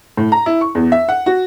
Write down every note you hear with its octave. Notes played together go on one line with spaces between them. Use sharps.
A2
A#5
E4
C#6
E2
E5
F#5
F#4